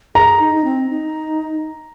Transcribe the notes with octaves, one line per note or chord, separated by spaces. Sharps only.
G#4 A#5
D#4
D#4
C4
D#4